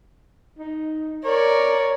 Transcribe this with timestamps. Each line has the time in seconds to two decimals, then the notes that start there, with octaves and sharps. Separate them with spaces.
0.59 D#4
1.24 A#4 C#5 D5